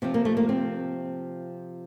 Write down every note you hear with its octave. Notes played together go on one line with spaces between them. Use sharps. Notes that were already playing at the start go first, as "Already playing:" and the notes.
C3 F3 C4
A#3
A3
A#3
C4